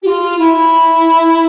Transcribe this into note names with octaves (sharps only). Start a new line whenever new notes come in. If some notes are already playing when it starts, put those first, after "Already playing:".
G4
F4
E4